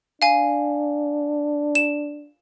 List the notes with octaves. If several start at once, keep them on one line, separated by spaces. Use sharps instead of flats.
D4 F5 G#5
E7